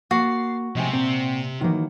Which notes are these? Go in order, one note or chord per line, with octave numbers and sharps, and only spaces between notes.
A#3 F#4 A6 C7
A2 C3 G#3 C4 G#5
A#2 C4
D#3 E3 F#3 A#3 F#5